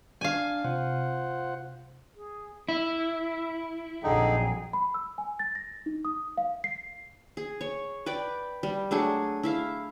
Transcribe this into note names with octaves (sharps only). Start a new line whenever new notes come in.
D4 F5 G#5
C3 F4 C5 F#5
G#4
E4 E6
A#1 F2 D3 F#3 D#4 G#4 G5 A#5
B5
E6
G#5
A6
A#6
D#4
D#6
F5
C7
G#4
C#5
B4 D5 G5
G3
F#3 A3 D4 G#4
E4 E5 F5